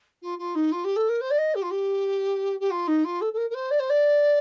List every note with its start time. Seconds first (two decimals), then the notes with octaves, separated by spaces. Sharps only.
0.22 F4
0.39 F4
0.55 D#4
0.72 F4
0.85 G4
0.96 A4
1.09 A#4
1.21 C5
1.31 D5
1.38 D#5
1.55 G4
1.63 F4
1.71 G4
2.60 G4
2.71 F4
2.88 D#4
3.05 F4
3.21 A4
3.33 A4
3.37 A#4
3.50 A#4
3.54 C5
3.71 D5
3.80 C5
3.90 D5